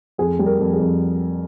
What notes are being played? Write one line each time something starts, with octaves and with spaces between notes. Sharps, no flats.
F2 G#4
G3
A#4
F2
G#4
F2